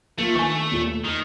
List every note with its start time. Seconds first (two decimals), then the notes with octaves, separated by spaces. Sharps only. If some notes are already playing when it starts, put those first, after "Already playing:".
0.18 C2 A3 A#3 F4
0.35 D#3 D4 B4 G#5 C#6
0.72 D#2 A#2
0.87 A3
1.04 E2 D#3